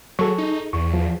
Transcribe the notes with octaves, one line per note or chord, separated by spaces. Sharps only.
F#3 G#4 A4 C#6
D#4
E2 C#6
F3